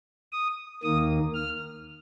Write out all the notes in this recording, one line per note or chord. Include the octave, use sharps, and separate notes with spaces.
D#6
D#2 D#3 A#3 D#6
F6